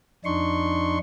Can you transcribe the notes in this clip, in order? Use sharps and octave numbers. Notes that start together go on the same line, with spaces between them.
F2 D4 D#4 C6 C#6